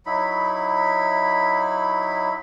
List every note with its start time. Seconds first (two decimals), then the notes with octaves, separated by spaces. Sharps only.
0.06 F#3 D#4 E4 B5